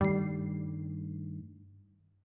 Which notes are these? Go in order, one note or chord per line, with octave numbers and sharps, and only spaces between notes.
G2 D#3 G3 A3 C7